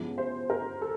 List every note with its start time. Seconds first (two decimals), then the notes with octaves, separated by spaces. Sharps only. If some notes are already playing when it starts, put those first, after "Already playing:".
Already playing: C#3 F3 G#3 B3 E4
0.18 C5
0.50 A#4
0.82 A4